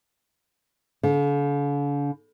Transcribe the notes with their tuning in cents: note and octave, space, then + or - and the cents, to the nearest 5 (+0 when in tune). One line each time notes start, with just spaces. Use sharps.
D3 -45